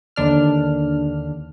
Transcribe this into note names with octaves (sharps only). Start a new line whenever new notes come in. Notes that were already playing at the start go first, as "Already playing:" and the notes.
D#2 D3 D4 F6